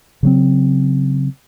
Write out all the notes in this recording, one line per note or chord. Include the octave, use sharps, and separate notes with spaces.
C#3 F#3 C4